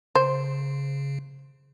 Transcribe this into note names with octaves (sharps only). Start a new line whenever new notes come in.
C#3 C5